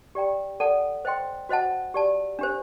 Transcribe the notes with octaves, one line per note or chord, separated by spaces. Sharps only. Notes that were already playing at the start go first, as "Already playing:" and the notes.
G4 D5 G5 A#5
A4 D5 F#5 A5
C5 D#5 G5 C6
F#4 C5 D#5 F#5 A5
G4 D5 A5
D4 G4 C5